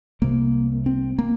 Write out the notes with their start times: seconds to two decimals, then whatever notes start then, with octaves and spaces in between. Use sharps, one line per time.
0.22 C2 C3 A#3
0.86 C4
1.19 A#3